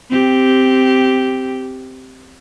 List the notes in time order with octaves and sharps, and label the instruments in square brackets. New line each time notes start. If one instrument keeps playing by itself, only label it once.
[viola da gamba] C4 G4